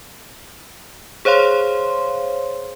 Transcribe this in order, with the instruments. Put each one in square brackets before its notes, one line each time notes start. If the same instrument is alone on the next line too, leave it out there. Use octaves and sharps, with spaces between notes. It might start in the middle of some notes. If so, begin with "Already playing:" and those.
[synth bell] G#4 C5 C#5 F5 C6